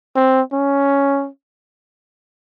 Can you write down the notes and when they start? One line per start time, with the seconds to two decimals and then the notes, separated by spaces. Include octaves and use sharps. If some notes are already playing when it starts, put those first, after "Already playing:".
0.16 C4
0.53 C#4